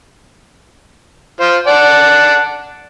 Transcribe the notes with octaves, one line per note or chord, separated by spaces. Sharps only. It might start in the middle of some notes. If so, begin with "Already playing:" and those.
F4 C5
D5 F#5 A5